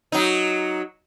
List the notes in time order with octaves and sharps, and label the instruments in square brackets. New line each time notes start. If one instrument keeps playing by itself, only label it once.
[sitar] F#3 D#4